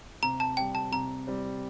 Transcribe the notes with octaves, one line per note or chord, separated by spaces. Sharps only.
C3 A#5
A5
G3 C4 G5
A5
C3 A#5
G3 C4